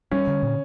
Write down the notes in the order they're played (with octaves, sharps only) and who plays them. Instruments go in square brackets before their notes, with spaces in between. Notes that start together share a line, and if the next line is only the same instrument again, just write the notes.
[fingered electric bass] G3 [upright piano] C#4
[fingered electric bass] D3
A#2